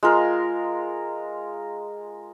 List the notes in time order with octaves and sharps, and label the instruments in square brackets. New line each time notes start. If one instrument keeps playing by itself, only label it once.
[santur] G#3 F4 A#4